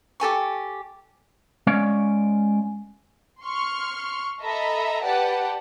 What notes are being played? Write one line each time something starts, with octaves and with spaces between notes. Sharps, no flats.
G4 A4 G#5 C#6
G#3 C#4 C#5 D5 F5
C6 C#6 F6
A4 D#5 E5 A#5 B5
G4 B4 D5 F#5 A5